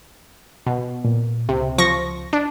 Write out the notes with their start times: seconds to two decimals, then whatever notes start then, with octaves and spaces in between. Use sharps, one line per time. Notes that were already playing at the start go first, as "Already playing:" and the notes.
0.67 B2
1.05 A#2
1.49 C#2 C3
1.78 F3 C#6 A#6
2.33 D4